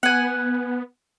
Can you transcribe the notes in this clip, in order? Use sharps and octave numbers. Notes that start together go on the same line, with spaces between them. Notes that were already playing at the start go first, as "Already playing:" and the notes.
B3 F#5 G#5